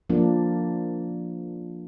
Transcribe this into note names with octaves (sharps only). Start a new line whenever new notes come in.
F3 A#3 D4